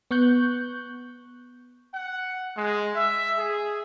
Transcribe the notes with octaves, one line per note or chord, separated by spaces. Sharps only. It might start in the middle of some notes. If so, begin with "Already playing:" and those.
B3 C#6 F#6 G6
F#5
G#3
E5
G#4